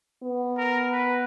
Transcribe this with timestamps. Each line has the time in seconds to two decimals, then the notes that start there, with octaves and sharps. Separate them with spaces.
0.23 B3
0.58 A#4
0.92 B4